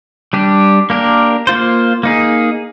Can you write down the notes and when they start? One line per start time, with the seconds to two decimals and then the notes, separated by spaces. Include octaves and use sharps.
0.33 G3 D4 G4
0.90 A#3 D4 G4 A#4
1.47 A#3 F4 C5
2.03 A#3 D#4 G#4